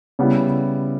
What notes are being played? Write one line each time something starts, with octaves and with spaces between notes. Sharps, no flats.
C#3 G3 B3 E4